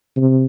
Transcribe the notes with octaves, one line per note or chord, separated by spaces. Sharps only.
C3